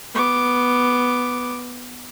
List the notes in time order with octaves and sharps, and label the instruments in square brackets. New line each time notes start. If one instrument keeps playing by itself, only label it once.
[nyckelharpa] B3 D6